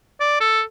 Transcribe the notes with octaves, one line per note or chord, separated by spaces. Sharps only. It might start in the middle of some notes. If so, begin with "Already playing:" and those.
D5
A4